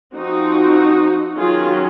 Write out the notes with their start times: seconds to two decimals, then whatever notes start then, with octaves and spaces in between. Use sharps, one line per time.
0.14 F3 C4 D#4 F#4
1.37 D#3 F#3 C#4 F4 G#4